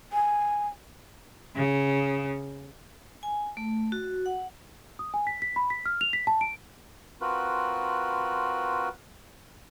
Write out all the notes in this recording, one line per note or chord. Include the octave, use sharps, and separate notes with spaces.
G#5
C#3
G#5
A3
F#4
F#5
D#6
G#5
B6
B6
B5
B6
F6
F7
B6
A5
D7
C4 F4 F#4 A#4 B4